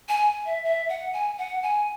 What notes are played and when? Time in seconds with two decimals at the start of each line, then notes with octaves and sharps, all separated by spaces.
0.09 G#5
0.46 E5
0.64 E5
0.89 F#5
1.13 G#5
1.38 F#5
1.63 G#5